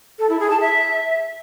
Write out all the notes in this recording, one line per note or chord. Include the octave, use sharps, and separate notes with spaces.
A4
E4
G#4
A5
E5